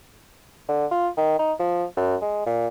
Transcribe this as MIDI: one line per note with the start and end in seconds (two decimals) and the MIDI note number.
0.69 0.86 50
0.91 1.09 65
1.18 1.38 51
1.39 1.53 63
1.60 1.85 53
1.97 2.16 42
2.22 2.43 56
2.46 2.68 46